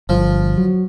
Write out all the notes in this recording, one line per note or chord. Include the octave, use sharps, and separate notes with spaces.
G1 F3
F#3